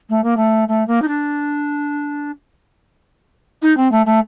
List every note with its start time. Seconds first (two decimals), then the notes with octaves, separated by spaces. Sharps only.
0.10 A3
0.24 A#3
0.37 A3
0.68 A3
0.88 A#3
1.02 D#4
1.08 D4
3.62 D#4
3.77 C4
3.92 A3
4.06 A3